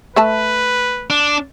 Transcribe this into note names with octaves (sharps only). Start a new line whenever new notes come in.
A3 B4 E5 A5
D4